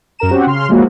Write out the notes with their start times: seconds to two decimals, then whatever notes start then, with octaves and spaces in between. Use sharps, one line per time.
0.19 F#2 A#4 A#5 E7
0.31 C4 C#4 F#4 G4
0.47 C#3 C6 F6
0.69 F3 F#3 G#3 A#3 E4 F#4